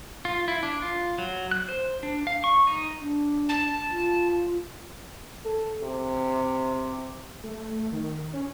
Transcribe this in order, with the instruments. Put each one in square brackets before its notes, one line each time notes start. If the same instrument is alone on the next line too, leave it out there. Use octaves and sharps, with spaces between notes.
[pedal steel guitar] F4
E4
D4
F4
F#3
F#6
C5
D4
F5
C#6
D#4
[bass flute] D4
[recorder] A5
[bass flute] F4
[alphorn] A4
C3
[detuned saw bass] A3
D#3
C#4